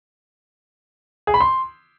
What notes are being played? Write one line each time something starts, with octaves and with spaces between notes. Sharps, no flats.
G#4
B5
C6